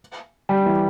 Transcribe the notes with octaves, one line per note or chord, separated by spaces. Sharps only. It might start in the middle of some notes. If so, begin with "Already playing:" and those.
G3
E3